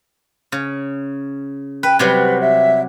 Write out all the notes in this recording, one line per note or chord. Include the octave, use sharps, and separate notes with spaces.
C#3
B4 G5
C3 F#3 G3 B4
E5